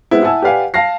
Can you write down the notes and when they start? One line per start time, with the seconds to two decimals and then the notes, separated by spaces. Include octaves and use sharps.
0.11 G#3 B3 C4 E4
0.23 E4 F#5 G#5 A5 E6
0.42 G4 B4 D5 F5 F#5 G#5
0.74 F5 A5 A#6 C7